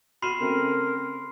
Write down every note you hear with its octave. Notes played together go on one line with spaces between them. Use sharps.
F#4 B5 C6 F6 C7 D#7 E7
C#3 A3 C4 A#4